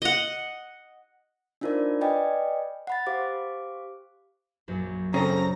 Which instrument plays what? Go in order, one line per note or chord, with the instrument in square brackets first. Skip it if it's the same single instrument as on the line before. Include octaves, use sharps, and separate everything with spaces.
[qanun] D#5 F#5
[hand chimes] D4 D#4 F4 A#4 C5 D5
B4 D5 D#5 G5 G#5 B5
F#5 B5 A6
G4 C5 F5 D6
[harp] A#1 F#2
[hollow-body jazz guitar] C#3 [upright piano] C4 C#4 A4 [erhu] A#5